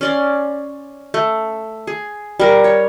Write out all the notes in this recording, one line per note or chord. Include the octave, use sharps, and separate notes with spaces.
C#4 D5 C6
A3
G#4
G3 A#4
C#5